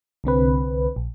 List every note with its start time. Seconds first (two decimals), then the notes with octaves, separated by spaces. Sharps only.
0.24 C2 D3 C4 B4
0.96 A#1